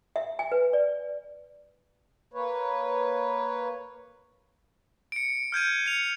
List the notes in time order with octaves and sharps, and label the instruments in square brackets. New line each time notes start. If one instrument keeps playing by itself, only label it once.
[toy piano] E5
G#5
B4
D5
[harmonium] A#3 B4 C#5
[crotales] C#7 D7
F6 G6 G#6 D#7
C#7 F7